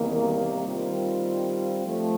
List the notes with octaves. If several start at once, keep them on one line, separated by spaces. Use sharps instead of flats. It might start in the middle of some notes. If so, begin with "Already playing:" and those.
Already playing: E2 C3 D#3 G3 A#3
D#3 G3 C4 F4
F3 A3